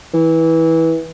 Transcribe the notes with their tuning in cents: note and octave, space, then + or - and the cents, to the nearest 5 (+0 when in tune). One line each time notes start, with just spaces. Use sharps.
E3 -20